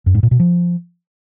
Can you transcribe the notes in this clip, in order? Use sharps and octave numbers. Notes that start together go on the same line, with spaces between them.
F#2
G#2
A#2
B2
F3